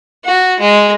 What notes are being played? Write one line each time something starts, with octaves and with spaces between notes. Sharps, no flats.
F#4
G#3